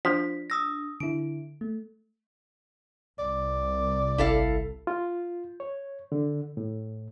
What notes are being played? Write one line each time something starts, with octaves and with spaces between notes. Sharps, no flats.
F3 D4 B6
D#6 E6 A#6
D3 E4 D7
A3
C2 D5
G#1 E4 A4 F5
F4
C#5
D3
A2